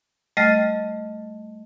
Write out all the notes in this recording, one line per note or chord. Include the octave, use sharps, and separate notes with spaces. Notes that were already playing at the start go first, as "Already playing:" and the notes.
G3 A3 D#5 F6 A6